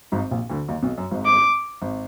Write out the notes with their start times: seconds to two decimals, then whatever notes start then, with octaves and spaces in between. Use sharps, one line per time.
0.12 G#1 G#2
0.31 A#1 A#2
0.50 D2 D3
0.68 D#2 D#3
0.83 B1 B2
0.98 F#2
1.11 G#1 G#2
1.26 D6
1.82 G#1